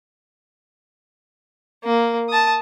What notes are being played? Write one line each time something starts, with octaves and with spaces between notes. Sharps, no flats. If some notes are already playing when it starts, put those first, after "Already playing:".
A#3
A5 D#6